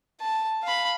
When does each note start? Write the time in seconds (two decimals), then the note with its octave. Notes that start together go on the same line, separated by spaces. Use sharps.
0.21 A5
0.63 F5 B5